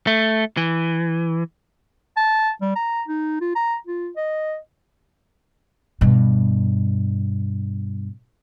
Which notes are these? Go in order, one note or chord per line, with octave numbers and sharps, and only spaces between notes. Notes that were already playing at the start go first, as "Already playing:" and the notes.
A3
E3
A5
G3
A#5
D#4
F4
A#5
F4
D#5
G2 B2